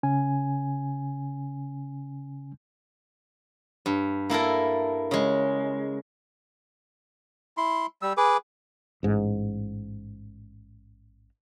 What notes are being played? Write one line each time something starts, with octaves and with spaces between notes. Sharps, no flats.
C#3 C#4 G#5
G2
A#3 E4 A4 A#4
C#3 G#3
E4 C6
G3 E6
G#4 B4 D6
A1 G#2